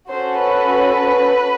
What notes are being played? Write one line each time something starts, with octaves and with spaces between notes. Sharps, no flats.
C#4 F#4 A4 C5
B4